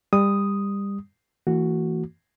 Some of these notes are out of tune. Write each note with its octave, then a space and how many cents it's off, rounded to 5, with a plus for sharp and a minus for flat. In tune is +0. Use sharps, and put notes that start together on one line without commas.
G3 +25 D#6 +0
E3 +0 A#3 -45 F#4 +0